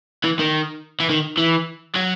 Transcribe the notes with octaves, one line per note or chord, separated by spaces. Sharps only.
E3
D#3
E3
D#3
E3
F#3